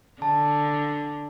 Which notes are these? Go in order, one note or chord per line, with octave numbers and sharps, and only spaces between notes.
D3 A5